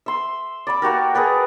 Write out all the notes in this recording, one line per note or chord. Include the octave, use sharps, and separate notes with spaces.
E5 C6
D5 B5 D6
A#3 F#4 G4 A#4
G#4 A#4 B4 D5